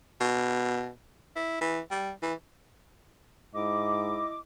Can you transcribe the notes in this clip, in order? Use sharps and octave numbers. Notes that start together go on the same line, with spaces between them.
B2
E4
E3
G3
E3
G#2 E4 D#5 D6